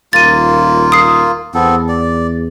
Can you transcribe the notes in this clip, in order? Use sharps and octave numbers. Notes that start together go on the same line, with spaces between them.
D#1 A#3 F4 A6 D#7
D#6 C7
E2 B3 C4 A4
D5